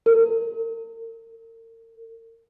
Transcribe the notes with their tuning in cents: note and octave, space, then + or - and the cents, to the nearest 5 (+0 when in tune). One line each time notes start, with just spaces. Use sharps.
A#4 -40